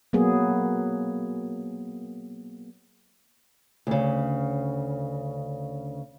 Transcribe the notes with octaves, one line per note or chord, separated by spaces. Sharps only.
F#3 A#3 B3 G#4
D2 C#3